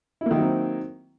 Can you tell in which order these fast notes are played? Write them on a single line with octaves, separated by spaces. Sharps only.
E4 A#3 D#3 F#3 C4